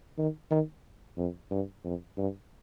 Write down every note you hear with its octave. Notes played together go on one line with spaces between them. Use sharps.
D#3
D#3
F2
G2
F2
G2